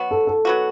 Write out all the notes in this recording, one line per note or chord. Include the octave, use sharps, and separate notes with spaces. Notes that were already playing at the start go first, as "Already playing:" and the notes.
Already playing: F#3 B3 F#4
A4
A4
F#3 B3 F#4